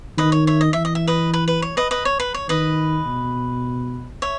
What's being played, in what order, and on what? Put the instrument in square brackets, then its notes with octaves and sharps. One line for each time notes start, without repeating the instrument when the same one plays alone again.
[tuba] D#3 [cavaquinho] B4 D#5
[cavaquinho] C#5
C#5 E5
D#5
[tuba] E3 [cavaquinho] E5
[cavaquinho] D#5
E5
B4 D#5
B4
B4
C#5
B4 D#5
B4 D#5
C#5
B4
C#5
[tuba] D#3 [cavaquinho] B4 D#5
[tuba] B2
[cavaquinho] C#5 E5